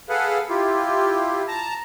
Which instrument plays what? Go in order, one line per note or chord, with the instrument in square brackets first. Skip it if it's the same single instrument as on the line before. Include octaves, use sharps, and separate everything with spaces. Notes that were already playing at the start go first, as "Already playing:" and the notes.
[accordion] G#4 A4 B4 F5 F#5
E4 F4 G4
A5 A#5